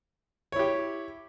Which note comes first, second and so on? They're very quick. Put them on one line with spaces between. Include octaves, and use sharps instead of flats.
C#5 E4 G4